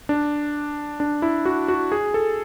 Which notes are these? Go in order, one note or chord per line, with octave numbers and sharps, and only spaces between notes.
D4
D4
E4
F#4
F#4
G#4
A4